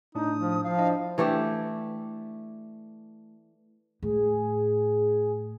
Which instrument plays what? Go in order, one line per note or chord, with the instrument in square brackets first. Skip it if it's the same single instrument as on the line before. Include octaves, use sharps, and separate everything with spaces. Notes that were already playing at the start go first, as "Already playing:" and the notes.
[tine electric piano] A2 D4 [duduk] D#4 [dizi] D#6
[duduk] F3
[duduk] F3 [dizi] F5
[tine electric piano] D4 E4 D#5
[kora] E3 A3 D4 G4
[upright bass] A2 [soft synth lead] G#4